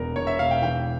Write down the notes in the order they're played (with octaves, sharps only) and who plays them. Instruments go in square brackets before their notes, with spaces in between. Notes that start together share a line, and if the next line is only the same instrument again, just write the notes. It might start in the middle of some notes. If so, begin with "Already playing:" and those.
Already playing: [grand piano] E1 E2 A#4
E1 C#5
E5
E1 F5
G5
E3 G5